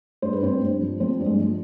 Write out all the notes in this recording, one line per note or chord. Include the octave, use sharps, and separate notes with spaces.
G2 C5
B4
G2 C4 C5
G2
F3
F3 C4 C5
G2
G#3 G#4
F3